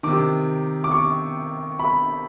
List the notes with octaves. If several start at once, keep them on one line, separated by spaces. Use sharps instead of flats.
C3 D#3 D6
D6
C#6
B5